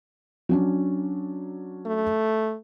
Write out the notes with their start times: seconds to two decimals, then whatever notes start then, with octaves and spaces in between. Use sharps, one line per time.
0.49 F#3 C#4 D4
1.86 A3